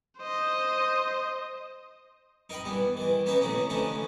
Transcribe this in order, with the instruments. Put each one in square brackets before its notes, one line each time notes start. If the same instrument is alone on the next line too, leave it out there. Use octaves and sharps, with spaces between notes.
[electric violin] C5 D#5
[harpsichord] D#4 A#4 D#5 G5 B5
G2 E3 B3
D#3 E3
A#3 B3 C#4 D#4 F#4 B4
F2 A2 C3 D#3 C#4 D#4
D3 E3 F3 A3 C#4 D#4